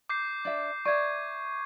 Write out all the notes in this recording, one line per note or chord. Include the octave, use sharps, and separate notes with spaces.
D6 G6 C7
D4 E5
D5 E5 C#6 G#6